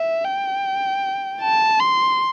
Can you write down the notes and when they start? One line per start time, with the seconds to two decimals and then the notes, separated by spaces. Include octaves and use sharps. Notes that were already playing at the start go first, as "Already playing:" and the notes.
Already playing: E5
0.25 G5
1.41 A5
1.80 C6